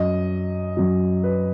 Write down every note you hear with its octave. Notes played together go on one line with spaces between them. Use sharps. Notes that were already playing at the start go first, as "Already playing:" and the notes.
Already playing: F#2 F#3 D#5
F#2 F#3
B4